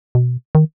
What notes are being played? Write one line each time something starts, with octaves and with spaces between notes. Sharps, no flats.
B2
D#3